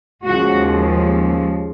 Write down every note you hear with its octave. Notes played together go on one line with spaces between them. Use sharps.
D#2 C#3 F3 G#3 F#4